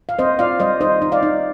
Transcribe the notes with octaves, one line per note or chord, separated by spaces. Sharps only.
F5
C4 C5 D#5
F4 D5 F5
G3 C5 D#5
D#4 C5 D#5
D#4
D5 F5
D#4